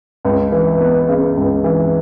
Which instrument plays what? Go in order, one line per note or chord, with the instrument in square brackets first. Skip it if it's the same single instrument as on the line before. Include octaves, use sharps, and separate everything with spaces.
[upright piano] C#2
E3
B3
C#3
C#2
E3